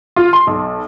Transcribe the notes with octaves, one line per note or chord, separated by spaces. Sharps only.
F4
C6
B1